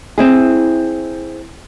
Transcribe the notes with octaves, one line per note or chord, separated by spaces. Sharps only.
C4 E4 G#4